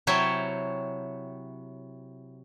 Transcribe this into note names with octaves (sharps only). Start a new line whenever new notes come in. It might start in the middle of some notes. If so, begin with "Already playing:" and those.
C3 F#3 E4 C#5 G5 A5